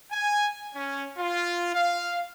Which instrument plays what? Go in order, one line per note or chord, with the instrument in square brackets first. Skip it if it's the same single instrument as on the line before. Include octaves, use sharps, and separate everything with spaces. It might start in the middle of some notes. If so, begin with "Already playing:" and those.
[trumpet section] G#5
C#4
F4
F5